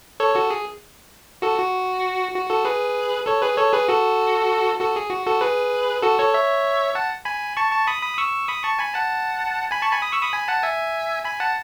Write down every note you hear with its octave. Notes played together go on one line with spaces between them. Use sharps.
A4 C#5
F#4 A4
G#4
F#4 A4
F#4
F#4
F#4 A4
G#4 B4
A4 C#5
G#4 B4
A4 C#5
G#4 B4
F#4 A4
F#4 A4
G#4
F#4
F#4 A4
G#4 B4
F#4 A4
A4 C#5
C#5 E5
F#5 A5
G#5 B5
A5 C#6
A5 C#6
B5 D#6
B5 D#6
D#6
C#6 E6
B5 D#6
A5 C#6
G#5 B5
F#5 A5
G#5 B5
A5 C#6
G#5 B5
B5 D#6
C#6 E6
B5 D#6
G#5 B5
F#5 A5
E5 G#5
G#5 B5
F#5 A5